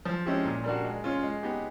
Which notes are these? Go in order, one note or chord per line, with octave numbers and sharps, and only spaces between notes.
F3
G#3 C#4 E4 G4
A#2
G3 A#3 D4 F#4
G#3
C#4 F4
G#3
B3 D#4 G4